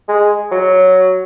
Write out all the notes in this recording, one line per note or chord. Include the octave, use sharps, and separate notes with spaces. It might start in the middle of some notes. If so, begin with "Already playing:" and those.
G#3
F#3